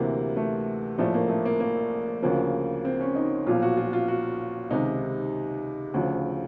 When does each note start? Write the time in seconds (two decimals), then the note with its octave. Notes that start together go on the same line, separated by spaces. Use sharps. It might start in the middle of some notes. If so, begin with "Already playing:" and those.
Already playing: D2 C3 E3 A#3
0.36 A3
0.98 A#1 A2 F3 A3
1.14 A#3
1.29 A3
1.45 A#3
1.60 A#3
2.22 D2 C#3 F3 A#3
2.85 C4
3.00 C#4
3.15 D#4
3.46 B1 A#2 F3 F4
3.62 F#4
3.77 F4
3.93 F4
4.08 F#4
4.70 C#2 C3 D#3 D#4
5.94 D2 C#3 F3